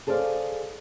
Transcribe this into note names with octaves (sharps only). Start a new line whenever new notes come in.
G#4 A4 C5 D5 F5